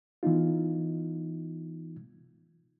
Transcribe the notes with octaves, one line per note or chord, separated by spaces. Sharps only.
E3 B3 D#4 F4